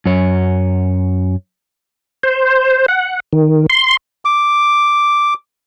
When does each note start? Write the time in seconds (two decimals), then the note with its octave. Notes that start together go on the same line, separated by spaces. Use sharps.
0.06 F#2 C#5
2.23 C5
2.88 F#5
3.33 D#3
3.70 C6
4.25 D6